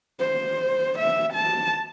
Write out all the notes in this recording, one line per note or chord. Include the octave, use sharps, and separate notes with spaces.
C5
E5
A5